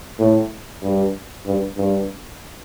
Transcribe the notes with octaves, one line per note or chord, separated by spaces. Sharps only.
A2
G2
G2
G2